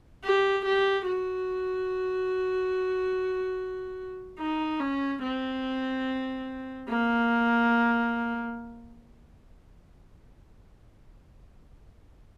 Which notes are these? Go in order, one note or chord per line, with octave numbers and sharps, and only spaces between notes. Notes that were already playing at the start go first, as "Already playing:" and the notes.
G4
G4
F#4
D#4
C#4
C4
A#3